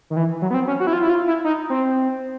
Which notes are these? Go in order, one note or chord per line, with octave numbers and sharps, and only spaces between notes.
D#3
E3
F#3
B3
C4
C#4
F#4
E4
F4
E4
F4
E4
D#4
C4